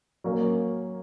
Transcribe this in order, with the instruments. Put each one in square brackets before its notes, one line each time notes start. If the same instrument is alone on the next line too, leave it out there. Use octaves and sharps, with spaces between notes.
[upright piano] F#3 A#3 C#4